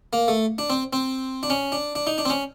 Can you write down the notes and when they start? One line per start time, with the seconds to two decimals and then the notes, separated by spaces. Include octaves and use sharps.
0.13 A#3
0.28 A3
0.58 D4
0.70 C4
0.93 C4
1.43 D4
1.50 C#4
1.72 D4
1.95 D4
2.07 D#4
2.18 D4
2.25 C4
2.30 C#4